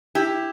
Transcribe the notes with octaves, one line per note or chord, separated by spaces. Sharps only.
E4 G4